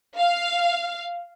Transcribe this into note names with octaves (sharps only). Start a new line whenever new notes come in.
F5